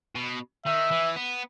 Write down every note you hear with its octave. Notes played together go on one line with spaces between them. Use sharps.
B2
D#3 E5
E3
B3